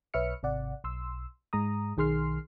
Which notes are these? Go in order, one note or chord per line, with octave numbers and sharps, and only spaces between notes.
B1 B4 C#5 E5 F6 C#7
G#1 C3 D5 F#5
B1 C6 E6
G#2 G#3 A#5 D#6
B1 D#3 G#4 C6 F6 C7